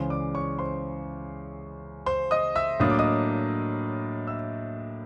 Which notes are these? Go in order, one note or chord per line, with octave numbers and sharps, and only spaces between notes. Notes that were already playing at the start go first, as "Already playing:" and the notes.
Already playing: C#2 C#3 E3 G#3 C5 C6
D5 D6
C#5 C#6
C5 C6
C5 C6
D#5 D#6
E5 E6
A2 F#3 A#3 D4 D#6
D6
D#5 D#6
E5 E6